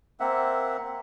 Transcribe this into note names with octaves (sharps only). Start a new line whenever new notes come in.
A#3 C4 E5 F#5